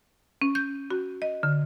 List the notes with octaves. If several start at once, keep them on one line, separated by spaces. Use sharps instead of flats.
C#4
G6
F#4
D#5
D3